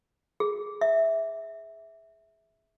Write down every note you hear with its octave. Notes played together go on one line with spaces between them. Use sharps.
G#4
E5